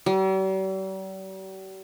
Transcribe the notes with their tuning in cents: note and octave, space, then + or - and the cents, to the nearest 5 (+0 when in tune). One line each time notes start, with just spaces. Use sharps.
G3 -45